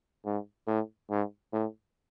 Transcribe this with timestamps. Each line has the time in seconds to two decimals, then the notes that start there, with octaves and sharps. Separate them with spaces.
0.25 G#2
0.67 A2
1.10 G#2
1.53 A2